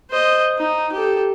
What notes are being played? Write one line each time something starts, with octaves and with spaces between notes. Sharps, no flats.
C5 D#5
D#4
G4 A4